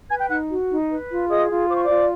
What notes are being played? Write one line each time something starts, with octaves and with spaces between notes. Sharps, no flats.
B4 G#5 G#6
G5 G6
D#4 F#5 F#6
F#4
D#4
B4
F4
G#4 D#5 D#6
F4
C5 D6
C#6
F4 D5 D6